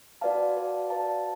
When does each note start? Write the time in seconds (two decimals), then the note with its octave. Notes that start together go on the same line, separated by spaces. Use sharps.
0.21 F#4 B4 D5 F5 A5
0.56 F#4 B4 D5 F5 A5
0.90 F#4 B4 D5 F5 A5